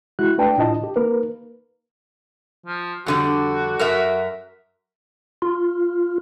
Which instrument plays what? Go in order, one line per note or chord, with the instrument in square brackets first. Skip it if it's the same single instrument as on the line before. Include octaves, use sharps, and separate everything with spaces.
[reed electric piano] G#3 E4 F#4 F#6
A3 D4 B4 D5 G5 A5
A2 D4 E4 F4 D#5 A5
G4
A#3 D#4 A#4 B4
[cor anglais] F3
[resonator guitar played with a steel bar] F2 D3 G3 [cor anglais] F#4
[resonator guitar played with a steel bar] F#2 A#4 E5
[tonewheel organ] F4